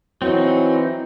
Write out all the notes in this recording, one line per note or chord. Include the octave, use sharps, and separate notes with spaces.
E3 F#3 C4 D#4